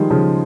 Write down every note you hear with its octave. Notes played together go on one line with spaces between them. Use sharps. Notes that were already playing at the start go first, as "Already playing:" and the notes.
Already playing: D#3 F3 G3 G#3
C#3 F3